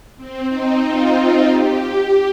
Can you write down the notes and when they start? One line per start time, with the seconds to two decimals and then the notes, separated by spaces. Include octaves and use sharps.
0.17 C4
0.49 D#4
0.83 F4
1.15 F4
1.48 G4